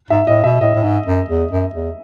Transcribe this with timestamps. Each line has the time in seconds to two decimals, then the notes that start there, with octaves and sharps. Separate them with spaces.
0.10 G#2 E5
0.27 A2 D#5
0.44 B2 E5
0.61 A2 D#5
0.75 A2
0.83 G#2
1.06 F#2
1.29 E2
1.51 F#2
1.74 E2